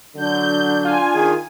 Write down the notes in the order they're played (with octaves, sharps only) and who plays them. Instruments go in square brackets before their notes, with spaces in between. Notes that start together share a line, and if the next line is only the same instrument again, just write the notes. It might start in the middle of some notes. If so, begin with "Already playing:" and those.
[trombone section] D3 F#3 [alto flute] D4 [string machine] G6
[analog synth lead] F4 [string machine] G#5
[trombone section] D#3 G#4